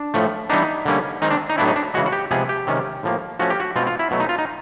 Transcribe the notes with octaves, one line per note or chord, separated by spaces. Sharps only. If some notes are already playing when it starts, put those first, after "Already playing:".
Already playing: D4
A2 F3 A3
E3 G3 B3 D4 D#4
D3 G3 A#3 C#4
D#3 G#3 C4 D#4
D4
D#4
A2 F#3 B3 D4 E4
D#4
D4
C#3 E3 G#3 F#4
F#4
G4
C3 F3 G#3 B3 G#4
G4
C3 D#3 G#3 C#4
A2 F3 A#3
F3 A3 C#4 F#4
G4
F#4
B2 G#3 C4 F4
F4
E4
B2 F#3 A3
D#4
F4
D#4